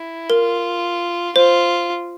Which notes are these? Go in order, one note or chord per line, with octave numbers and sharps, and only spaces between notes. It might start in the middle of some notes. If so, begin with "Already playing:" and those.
Already playing: E4
F4 A#4
F4 C5